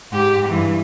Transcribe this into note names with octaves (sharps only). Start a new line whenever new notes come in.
G#2 G4
G2 E3